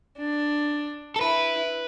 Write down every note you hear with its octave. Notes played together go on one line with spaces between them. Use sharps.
D4
A4
E4 B4